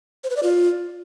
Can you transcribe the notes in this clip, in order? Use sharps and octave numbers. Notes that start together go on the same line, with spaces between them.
C5
B4
D5
F4